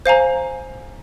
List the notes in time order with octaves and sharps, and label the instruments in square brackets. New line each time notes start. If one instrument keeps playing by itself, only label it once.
[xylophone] C5 F5 G#5 A#5